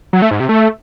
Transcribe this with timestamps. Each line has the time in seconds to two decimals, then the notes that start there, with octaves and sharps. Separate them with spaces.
0.13 F#3
0.22 A3
0.31 G#2
0.40 C3
0.49 A3